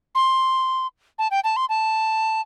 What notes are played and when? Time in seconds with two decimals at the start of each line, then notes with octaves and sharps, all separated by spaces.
0.15 C6
1.19 A5
1.31 G5
1.44 A5
1.56 C6
1.69 A5